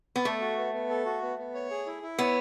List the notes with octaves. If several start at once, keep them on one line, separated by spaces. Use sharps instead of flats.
B3
A3 A4
F#4
B3
B3
A4
F#4
B3
B3
C#5
G#4
E4
E4
B3 C#5